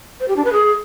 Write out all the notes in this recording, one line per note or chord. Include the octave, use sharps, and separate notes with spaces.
C5
G4
D4
B4
G#4